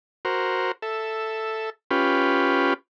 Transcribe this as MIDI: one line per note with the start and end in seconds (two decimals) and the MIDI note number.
0.25 0.72 66
0.25 0.72 70
0.25 0.72 72
0.82 1.70 69
0.82 1.70 76
1.91 2.74 61
1.91 2.74 65
1.91 2.74 67
1.91 2.74 71